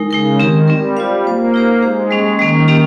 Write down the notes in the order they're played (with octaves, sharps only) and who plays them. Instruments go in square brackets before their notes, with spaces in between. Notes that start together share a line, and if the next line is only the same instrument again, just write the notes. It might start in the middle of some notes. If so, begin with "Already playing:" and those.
Already playing: [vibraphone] G#3 D#4 A#4
[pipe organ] C#3 [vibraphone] G#3 D#4 A#4
[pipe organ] D#3 [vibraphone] C4 G4 A#4
[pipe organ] G3 [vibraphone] C4 G4 A#4
[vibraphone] F4 C5 F5
[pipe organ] A#3 [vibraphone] F4 C5 F5
[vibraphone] D#4 G4 C5
[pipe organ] G#3 [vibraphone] D#4 G4 C5
[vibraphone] G3 A#3 C#4
[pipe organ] D#3 [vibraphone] G3 A#3 C#4
[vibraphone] A#3 C#4 G4